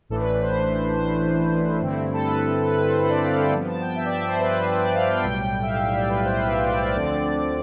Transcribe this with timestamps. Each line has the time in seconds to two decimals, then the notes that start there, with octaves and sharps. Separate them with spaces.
0.09 A1 A2 E3 A3 D4 A4
0.21 B4
0.32 B4
0.42 C5
0.53 C5
0.96 C5
1.81 G2 D3 A3 C4 E4
2.13 A4
2.24 B4
2.67 B4
2.78 B4
2.89 C5
2.99 B5
3.10 D5
3.25 F5
3.39 G5
3.52 G2 F3 B3 A5
3.67 A5
3.81 G5
3.96 E5
4.05 D5
4.14 E5
4.28 C5
4.39 B4
4.47 C5
4.52 B4
4.67 C5
4.81 D5
4.95 F5
5.10 G5
5.24 B1 A2 G3 G5
5.62 E5
5.66 F5
5.81 E5
5.95 D5
6.09 B4
6.25 C5
6.38 B4
6.52 E5
6.66 D5
6.81 D5
6.95 D2 D3 F3 C4 D5